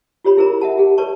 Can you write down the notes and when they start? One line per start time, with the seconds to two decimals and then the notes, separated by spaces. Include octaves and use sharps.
0.25 F4 G4 C#5 B5
0.37 E4 G#4 A#4 C5 A#5
0.61 E5 F#5 A5
0.78 G4 G#4 F#5
0.98 B4 C#5 D5 A5 C#6